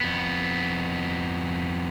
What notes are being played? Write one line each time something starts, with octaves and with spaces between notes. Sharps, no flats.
F2 B3